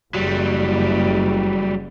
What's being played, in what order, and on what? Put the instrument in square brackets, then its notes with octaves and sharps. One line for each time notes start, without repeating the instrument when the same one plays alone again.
[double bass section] F#1 [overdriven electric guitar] F#3 G3